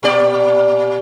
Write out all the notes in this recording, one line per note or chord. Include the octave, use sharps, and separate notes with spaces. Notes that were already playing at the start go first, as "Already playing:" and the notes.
A#2 G4 D5